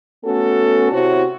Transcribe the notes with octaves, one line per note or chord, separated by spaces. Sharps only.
A3 B3 C#4 F#4 A4
C3 E4 F#4 C5 C#5